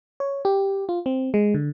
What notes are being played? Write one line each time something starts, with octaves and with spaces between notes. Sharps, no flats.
C#5
G4
F4
C4
G#3
D3